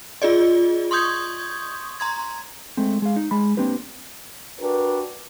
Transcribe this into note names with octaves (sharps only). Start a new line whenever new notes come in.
F4 G#4 D5 D#5
C6 C#6 D#6 G6 G#6
A#5 C6 G#6
G#3 A3 C4
G#3 F5
D#4
G#3 B5
A#3 C4 D4 G4 B4
D4 F#4 G4 A#4 B4